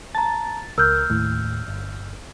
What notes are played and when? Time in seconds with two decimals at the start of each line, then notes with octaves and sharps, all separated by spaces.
0.15 A5 A#5 A6
0.78 C#2 A#4 E6 F6 G6
1.10 D#2 A2
1.68 G1